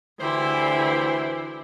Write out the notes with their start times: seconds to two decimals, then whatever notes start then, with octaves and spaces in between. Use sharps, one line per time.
0.20 D2 D3 E3 E4 G4 C5